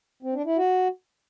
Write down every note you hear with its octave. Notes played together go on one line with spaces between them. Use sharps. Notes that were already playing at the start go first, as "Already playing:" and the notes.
C4
D4
E4
F#4